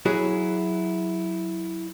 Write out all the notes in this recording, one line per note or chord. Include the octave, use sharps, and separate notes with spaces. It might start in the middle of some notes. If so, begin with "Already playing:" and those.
F#3 E4 F#4 G#4